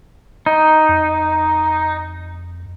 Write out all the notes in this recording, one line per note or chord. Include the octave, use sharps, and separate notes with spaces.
D#4
F2